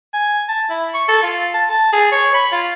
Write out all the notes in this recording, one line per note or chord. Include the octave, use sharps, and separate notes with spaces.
G#5
A5
E4
C#6
A4
F4
A5
A5
G#4
C#5
B5
F4